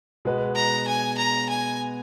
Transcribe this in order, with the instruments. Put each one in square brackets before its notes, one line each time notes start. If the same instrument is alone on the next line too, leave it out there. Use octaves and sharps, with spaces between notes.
[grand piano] B2 G#3 B3 F#4 B4
[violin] A#5
G#5
A#5
G#5